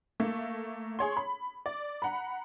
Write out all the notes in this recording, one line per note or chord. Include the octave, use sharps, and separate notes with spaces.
A3 A#3
G#4 C#5 C6
B5
D5
F#5 A#5 B5